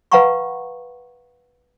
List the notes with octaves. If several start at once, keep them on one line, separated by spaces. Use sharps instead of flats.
B4 F5 F#5 A#5 B5 C#6